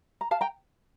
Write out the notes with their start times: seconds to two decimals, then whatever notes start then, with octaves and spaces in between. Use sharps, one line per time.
0.21 A#5
0.31 F5 A5
0.41 G5 A#5